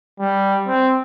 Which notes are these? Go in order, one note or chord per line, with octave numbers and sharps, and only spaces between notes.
G3
C4